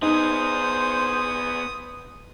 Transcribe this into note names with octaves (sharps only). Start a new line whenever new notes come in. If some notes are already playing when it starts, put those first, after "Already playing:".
B3 D#4 G#4 C5 D#6